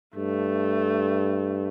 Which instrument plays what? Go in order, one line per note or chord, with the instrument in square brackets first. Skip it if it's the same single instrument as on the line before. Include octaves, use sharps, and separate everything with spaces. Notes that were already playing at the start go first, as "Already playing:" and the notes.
[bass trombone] G2 [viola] A3